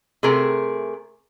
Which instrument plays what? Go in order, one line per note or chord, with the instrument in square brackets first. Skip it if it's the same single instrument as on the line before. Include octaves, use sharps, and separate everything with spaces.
[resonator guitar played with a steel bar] C3 A3 G#4 A#4